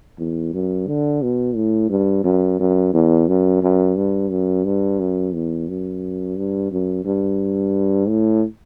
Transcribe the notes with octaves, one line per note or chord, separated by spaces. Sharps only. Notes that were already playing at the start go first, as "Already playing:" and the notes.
E2
F#2
D3
B2
A2
G2
F#2
F#2
E2
F#2
F#2
G2
F#2
G2
F#2
E2
F#2
G2
F#2
G2
A2